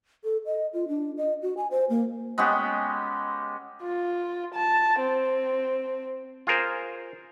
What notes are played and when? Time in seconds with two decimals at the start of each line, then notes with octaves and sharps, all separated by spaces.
0.24 A4
0.46 D#5
0.73 F4
0.88 D4
1.17 D#5
1.42 F#4
1.57 G#5
1.71 C5
1.90 A#3
2.38 G#3 B3 C#4 G4
3.83 F4
4.55 A5
5.00 C4
6.47 F4 G#4 A#4 C5